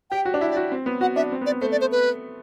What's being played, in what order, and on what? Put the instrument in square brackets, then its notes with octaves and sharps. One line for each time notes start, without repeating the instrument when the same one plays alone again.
[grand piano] G4 [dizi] G5
[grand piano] F#4
D4
[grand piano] E4 [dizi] E5
[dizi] D5
[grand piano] F#4
C4
B3
[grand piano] F#4 [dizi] F#5
[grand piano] D4 [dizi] E5
[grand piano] C4
B3
[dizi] D5
[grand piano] B3
[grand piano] A3 [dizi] C5
[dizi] D5
C5
B4